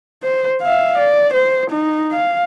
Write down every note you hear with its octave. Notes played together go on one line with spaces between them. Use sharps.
C5
E5 F5
D5
C5
D#4
F5